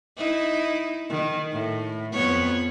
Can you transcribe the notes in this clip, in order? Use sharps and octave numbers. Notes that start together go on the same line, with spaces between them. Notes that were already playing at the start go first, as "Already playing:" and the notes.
D#4 E4
D#3
A2
F2 B3 C#5